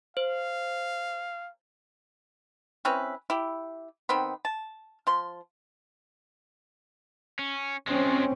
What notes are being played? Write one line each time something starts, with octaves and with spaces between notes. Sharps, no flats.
C5 F5
C4 C#4 E4 B4
E4 G4
D#3 B3 C4 B5
A5
F3 C6
C#4
F3 G#3 C4 C#4